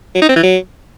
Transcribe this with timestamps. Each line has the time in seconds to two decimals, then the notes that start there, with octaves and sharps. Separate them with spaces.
0.15 F#3
0.22 D#4
0.29 C4
0.36 E3
0.43 F#3